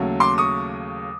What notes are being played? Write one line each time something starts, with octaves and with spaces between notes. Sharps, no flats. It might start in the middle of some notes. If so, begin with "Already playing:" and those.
Already playing: D#2 C#3 F#3 A3
C6 D6
C#6 D#6